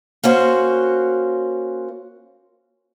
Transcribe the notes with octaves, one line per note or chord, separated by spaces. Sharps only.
A#3 C#4 F#4 C5